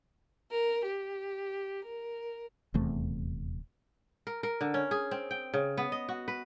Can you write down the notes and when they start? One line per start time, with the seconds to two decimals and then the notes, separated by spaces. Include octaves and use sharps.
0.51 A#4
0.86 G4
1.85 A#4
2.74 D#1 E2 C3 A3
4.27 A#4
4.43 A#4
4.61 D3
4.74 C#4
4.91 G#4
5.11 C4
5.31 G5
5.54 C#3
5.77 B3
5.92 D#5
6.09 F#4
6.28 B4